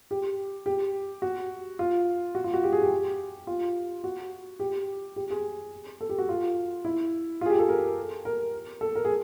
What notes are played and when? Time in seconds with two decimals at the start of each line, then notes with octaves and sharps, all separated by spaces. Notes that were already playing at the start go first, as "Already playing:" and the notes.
0.11 G4
0.66 G4
1.22 F#4
1.79 F4
2.35 F#4
2.44 F4
2.54 F#4
2.64 G4
2.72 G#4
2.82 G4
3.47 F4
4.04 F#4
4.60 G4
5.16 G4
5.30 G#4
6.01 A4
6.09 G4
6.18 F#4
6.29 F4
6.85 E4
7.41 F4
7.46 G#4
7.50 G4
7.59 A4
7.69 A#4
8.25 A#4
8.81 A4
8.95 A#4
9.05 G#4